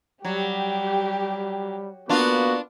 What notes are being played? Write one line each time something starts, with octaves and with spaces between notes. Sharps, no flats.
F#3 G3 G4
A#3 B3 D4 F4 F#4